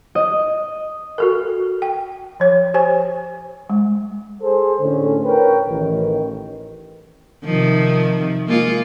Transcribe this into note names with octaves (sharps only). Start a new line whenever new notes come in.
D#5
F#4 A4 A#4
G5
F3 C#5
G4 C5 G#5
G#3
G#4 A4 C5
A2 D3 C#4
A#4 B4 C#5 G5
A1 D#3
C3 D#3 F3
G#3 A#3 F4